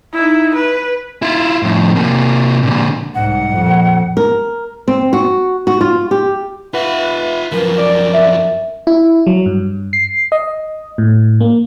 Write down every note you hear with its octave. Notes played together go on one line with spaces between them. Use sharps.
D#4 E4
B4
E4 F4
F2 A2
C3 A#3
A#2 D3
C2 G#2 F#5
F2 A#2
A#4
C4
F#4
F#4
F4
G4
F4 B4 E5 F#5
F#2 F3 A#4
D5
E5
E4
F#3
G2
C7
D#5
A2
A#3